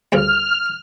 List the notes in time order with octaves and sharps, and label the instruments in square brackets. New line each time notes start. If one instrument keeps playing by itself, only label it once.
[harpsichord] D2 G2 C#3 [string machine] F6